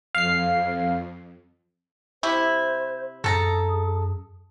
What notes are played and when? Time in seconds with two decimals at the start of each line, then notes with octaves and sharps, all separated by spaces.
0.15 F2 F5 C7
2.23 C3 E4 C5
3.24 F#2 G#4 A4 A5 A#5